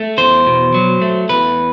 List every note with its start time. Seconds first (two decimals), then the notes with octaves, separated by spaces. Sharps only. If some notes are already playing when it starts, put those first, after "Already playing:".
Already playing: A3
0.18 E2 C5
0.47 B2
0.74 F#3
1.02 A3
1.29 E2 B4